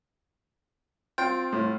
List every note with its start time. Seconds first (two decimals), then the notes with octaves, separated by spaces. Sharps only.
1.18 C4 F4 G5
1.52 A2